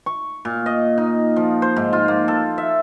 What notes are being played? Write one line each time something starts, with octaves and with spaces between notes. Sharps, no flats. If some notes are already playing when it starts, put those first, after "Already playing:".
C#6
A#2
D#5
D#4
F3
C5
G#2
F4
A#3
A4
E5